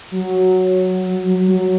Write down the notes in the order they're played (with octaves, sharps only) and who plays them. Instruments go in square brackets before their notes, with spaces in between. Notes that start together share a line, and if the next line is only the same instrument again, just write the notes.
[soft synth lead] F#3
F#3